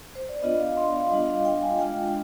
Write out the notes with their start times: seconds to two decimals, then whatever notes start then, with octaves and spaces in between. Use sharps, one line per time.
0.15 C5
0.29 D5
0.42 B3 D4 F4 D#5
0.59 F5
0.77 C6
0.93 F5
1.11 G3 D4 F4 D#5
1.28 F5
1.45 G5
1.62 G#5
1.79 G#3 D4 F4 G5
2.07 G5